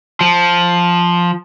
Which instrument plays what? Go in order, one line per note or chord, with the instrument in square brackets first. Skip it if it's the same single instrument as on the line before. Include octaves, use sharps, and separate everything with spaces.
[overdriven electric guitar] F3